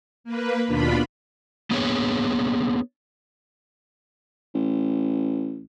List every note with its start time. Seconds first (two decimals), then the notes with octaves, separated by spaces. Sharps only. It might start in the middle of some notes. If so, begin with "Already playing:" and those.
0.24 A#3 B4
0.68 D#2 B2 D4 F4 B5
1.71 A#3 B3 D4 G#4 B4 C#5
4.55 A1